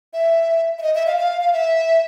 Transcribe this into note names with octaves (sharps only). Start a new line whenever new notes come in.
E5
E5
D#5
E5
F5
F5
F5
E5